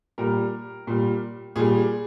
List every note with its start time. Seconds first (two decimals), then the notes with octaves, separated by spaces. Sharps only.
0.18 A#2 G3 A#4
0.87 A#2 G3
1.56 A#2 G3 G#4